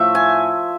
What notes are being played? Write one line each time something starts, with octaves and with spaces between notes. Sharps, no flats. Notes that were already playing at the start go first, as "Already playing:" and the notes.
Already playing: A2 F3 A3 E5
G#5